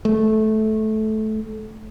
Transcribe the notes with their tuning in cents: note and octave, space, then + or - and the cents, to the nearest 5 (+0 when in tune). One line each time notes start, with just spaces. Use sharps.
A3 -15